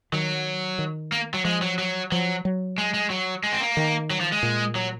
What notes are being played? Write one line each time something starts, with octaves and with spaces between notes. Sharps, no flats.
D#3 F#3
D#3
A#3
F#3
F3 G#3
F#3
F#3
F3 F#3
F#3
G#3
G#3
F#3
G#3
C4
A#3
D#3
F#3
F3
G#3
A#2
F#3